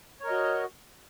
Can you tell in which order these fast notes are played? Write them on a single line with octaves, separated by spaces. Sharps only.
C#5 A#4 D#5 F#4